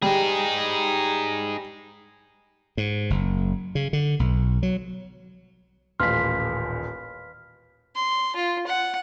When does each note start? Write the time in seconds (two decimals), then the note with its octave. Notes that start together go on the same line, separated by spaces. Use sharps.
0.02 G3 D#4 G#4
2.77 G#2
3.10 F#1
3.75 C#3
3.93 D3
4.20 B1
4.63 F#3
6.00 D#1 A1 B4 F5 C6 F6 B6
7.95 C6
8.36 F4
8.67 F#5